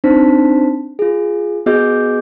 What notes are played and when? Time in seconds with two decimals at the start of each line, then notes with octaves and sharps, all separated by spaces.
0.04 C4 D4 D#4 C5 A5 B6
0.99 F4 G#4
1.66 B3 F#4 G#4 D#5 D6 G6